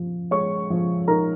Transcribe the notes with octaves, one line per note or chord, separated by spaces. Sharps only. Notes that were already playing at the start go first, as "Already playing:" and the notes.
Already playing: F3
G#3 C#5 C#6
F3
D#4 A#4 A#5